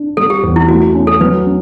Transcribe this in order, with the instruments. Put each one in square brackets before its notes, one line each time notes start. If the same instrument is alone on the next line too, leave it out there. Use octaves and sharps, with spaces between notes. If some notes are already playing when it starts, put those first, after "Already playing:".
Already playing: [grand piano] D4
[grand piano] G3 [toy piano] A4
[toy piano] G4
[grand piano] E2
[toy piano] E4
[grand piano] A3 [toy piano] F#4
[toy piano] F#4
[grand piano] C#4
[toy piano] A4
[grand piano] F#3 [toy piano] B4
[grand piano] C#4